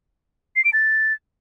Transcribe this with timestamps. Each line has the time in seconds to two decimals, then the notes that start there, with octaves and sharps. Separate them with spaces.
0.56 C7
0.65 D7
0.73 A6